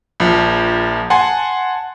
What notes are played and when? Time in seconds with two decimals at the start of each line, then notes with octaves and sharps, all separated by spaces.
0.20 A#1 F3
1.10 F#5 G#5 A5 C6